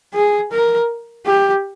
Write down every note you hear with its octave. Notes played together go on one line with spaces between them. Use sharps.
G#4
A#4
G4